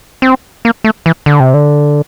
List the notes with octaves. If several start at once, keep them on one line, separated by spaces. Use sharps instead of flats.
C4
A#3
A3
E3
D3
C3
D3